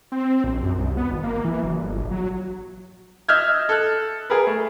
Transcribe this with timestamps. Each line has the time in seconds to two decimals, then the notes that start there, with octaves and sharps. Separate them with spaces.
0.12 C4
0.44 A#1
0.63 F#2
0.78 C2
0.97 B3
1.11 G#1
1.24 A#3
1.44 E3
1.64 F#1
1.78 G1
1.98 A#1
2.11 F#3
3.29 D#5 E5 E6 F6 G6 G#6
3.69 A4 F#6
4.30 G#4 A#4 B4
4.47 A3